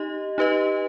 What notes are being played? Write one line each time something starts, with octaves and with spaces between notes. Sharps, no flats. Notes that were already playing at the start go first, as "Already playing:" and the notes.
Already playing: D#4 G4 D#5
D#4 G4 B4 D#5